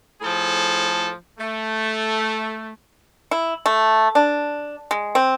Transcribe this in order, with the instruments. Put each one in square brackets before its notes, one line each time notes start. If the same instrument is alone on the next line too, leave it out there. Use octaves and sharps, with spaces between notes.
[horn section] A2 F3 G#4 A4
A3
[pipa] E4
A3
D4
G#3
C4